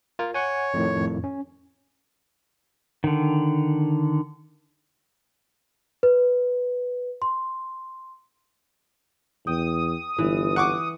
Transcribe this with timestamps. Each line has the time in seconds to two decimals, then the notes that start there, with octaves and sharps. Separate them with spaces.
0.19 F4 A#4
0.34 C#5 F#5 G#5
0.74 F2 A2 D#3
1.24 C#4
3.04 D3 D#3
6.03 B4
7.22 C6
9.47 E2 G5 D#6
10.19 G1 E3
10.56 F#5 C#6 D6